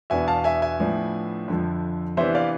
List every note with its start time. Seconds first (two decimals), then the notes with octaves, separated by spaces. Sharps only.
0.10 E2 B2 B3 D4 E5 G#5
0.28 F5 A5
0.44 E5 G#5
0.62 E5 G#5
0.79 A2 F3 B3 D4
1.48 F2 D3 F3
2.17 C3 E3 B3 D4 C5 E5
2.35 D5 F5